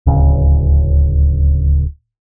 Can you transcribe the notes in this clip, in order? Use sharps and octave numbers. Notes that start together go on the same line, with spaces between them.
D1 C#2 C#3